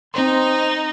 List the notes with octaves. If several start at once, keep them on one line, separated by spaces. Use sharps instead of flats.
C4 D#4 C5 C6